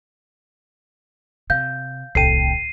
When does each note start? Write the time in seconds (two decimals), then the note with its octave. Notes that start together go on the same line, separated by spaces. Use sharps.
1.50 C3 F5 G6
2.15 D1 C2 A4 G5 C7 D#7